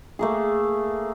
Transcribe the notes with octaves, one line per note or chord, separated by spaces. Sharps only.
A3 A#3 G#4